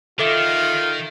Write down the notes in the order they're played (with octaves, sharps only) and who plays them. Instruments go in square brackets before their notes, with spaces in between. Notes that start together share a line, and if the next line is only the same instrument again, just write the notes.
[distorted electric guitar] D#3 [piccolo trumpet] F4 [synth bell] A4 E5